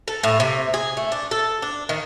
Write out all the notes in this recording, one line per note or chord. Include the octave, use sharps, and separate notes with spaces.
A4
A2
C3
G#4
A3
D4
A4
D4
D#3